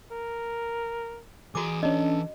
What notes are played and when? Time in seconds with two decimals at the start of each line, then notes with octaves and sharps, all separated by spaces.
0.12 A#4
1.55 E3 F#4 G#4 A#5 D6
1.83 C#4 D4 A4 D#5